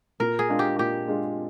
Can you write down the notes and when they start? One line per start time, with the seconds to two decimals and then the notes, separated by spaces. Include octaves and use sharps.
0.20 A#2 A#4
0.39 G#4
0.49 G#3 D4 F4
0.59 G4
0.78 A#2 G4
1.08 G#3 D4 F4